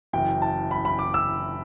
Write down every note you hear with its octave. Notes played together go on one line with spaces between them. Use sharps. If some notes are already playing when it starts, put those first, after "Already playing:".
F#1 F#2 E3 G5
A5
B5
B5
D6
E6